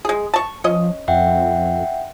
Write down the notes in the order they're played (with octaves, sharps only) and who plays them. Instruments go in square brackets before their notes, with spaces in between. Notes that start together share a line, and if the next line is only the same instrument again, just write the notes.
[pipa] G#3 G#4
A5 C#6
[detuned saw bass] F3 [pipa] C#4 D#5
[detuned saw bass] F2 [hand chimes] E5 F#5 G5